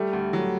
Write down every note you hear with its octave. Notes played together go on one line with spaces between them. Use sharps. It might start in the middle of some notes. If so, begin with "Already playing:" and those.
Already playing: G3 A3
D2
F#3